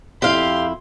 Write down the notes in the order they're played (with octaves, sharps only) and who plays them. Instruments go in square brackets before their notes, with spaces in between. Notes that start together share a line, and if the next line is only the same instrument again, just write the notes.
[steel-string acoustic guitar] F2 E4 [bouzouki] G4 F5 [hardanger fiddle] C6